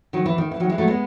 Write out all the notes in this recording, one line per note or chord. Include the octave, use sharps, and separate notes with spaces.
D#3 F#3
E3
D#3
E3
D#3 F#3
E3 G#3
F#3 A3
G#3 B3